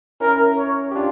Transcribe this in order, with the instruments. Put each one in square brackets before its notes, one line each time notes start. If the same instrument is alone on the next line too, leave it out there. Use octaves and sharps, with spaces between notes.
[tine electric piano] C#4 E4 [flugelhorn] A#4
[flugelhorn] C#5
[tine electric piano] G4
D4 F4